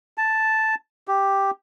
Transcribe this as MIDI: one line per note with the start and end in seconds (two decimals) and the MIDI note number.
0.18 0.75 81
1.08 1.51 67